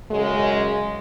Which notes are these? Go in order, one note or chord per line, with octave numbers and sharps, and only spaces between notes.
F#2 C#3 G#3